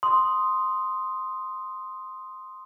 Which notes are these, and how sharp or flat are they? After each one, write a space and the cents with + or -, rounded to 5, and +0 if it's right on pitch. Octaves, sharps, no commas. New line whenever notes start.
C6 +0 D#6 +0